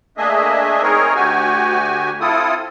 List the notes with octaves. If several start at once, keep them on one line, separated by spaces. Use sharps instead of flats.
A3 A#3 D4 G#4 D#5 E5
C4 D#4 G#4 A#4 C#5
D2 F#4 G4 G#5
C4 E4 F4 A4 D#6